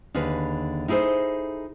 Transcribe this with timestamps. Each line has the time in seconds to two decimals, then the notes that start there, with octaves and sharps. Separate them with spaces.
0.14 D#2 D3 G#4 B4
0.88 D#4 E4 G#4 A4 C5